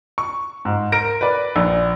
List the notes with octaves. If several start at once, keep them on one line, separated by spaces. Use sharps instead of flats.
C#6
G#2
A#4 A#6 D7
B4 D5
A#1